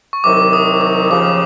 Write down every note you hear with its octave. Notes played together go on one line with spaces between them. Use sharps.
C#6
C2 C3 D#3 F#3 D6
D#6
D6
D#2 C#3 F3 D6